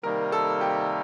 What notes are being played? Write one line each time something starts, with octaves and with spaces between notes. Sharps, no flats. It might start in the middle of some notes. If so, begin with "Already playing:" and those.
C3 D#3 G3 A#3 A#4
A4
G4